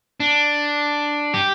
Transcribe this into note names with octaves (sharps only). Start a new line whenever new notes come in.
D4
G4